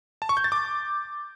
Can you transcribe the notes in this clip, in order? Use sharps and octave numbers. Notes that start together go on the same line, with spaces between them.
A5
C#6
G6
A6
D6